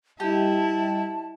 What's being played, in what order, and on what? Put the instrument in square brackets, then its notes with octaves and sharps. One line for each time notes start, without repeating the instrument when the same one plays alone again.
[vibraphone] G3 D#5 E5 [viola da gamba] E4 [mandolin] G4 [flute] A5